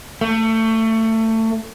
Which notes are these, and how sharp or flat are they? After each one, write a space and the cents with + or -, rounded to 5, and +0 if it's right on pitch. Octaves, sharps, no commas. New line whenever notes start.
A3 +25